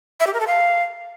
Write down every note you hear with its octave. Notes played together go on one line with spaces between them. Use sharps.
E5
G4
A#4
A4
F5